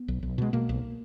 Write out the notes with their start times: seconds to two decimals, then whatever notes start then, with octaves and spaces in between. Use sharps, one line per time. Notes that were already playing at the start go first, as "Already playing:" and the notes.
Already playing: B3
0.08 B1
0.23 B1
0.38 B2 G#3
0.53 B2 A#3
0.69 B1